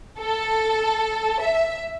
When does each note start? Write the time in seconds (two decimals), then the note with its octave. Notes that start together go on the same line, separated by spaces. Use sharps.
0.19 A4
1.42 E5